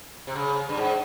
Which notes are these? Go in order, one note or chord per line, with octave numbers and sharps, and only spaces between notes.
C3
C#3
G2
G#2